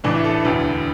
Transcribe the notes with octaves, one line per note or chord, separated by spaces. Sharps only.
A1 A2 E3 D4
E4
A4
B4
E1 D2 D3